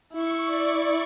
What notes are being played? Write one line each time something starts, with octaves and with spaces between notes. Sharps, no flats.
E4 C#6
D5